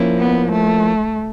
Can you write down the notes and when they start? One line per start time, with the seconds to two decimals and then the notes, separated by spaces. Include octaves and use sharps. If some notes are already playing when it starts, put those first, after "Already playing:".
Already playing: F3 A#3 C#4 E4
0.18 B3
0.52 A3